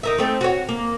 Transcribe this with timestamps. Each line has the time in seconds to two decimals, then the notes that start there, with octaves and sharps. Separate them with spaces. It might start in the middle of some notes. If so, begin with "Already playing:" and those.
0.03 D#4 A#4 E5
0.18 A3 C4 D#4
0.41 F#4 C#5
0.69 A#3